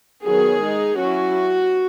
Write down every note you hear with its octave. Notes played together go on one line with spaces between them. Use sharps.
D#3 F#3 B3 G#4
G#3 D#4
F#3 C#4 E4 F#4